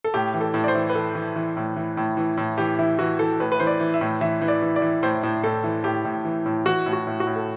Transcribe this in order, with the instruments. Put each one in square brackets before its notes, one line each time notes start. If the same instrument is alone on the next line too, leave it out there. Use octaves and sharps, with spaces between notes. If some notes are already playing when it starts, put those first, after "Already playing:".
[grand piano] A4
A2 G4
E3
A4
A2
D5
C5
E3
B4
E3 A4
E3
E3
A2
E3
A2
E3
A2
E3 G4
E3 E4
E3 F#4
E3 A4
A2 B4
B4
E3 C5
D5
E3
E5
A2
E3 E5
E3
D5
E3
D5
E3
A2 C5
A2
A2 A4
E3
A2 G4
A2
E3
A2
E3 F#4
A2
F#4
A2
F#4
A2
A4